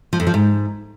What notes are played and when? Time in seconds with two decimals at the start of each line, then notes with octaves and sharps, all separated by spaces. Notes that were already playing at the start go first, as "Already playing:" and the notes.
0.13 F3
0.20 F2
0.27 F3
0.34 G#2